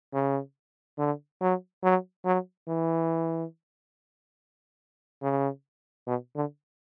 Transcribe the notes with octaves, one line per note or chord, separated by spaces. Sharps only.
C#3
D3
F#3
F#3
F#3
E3
C#3
B2
D3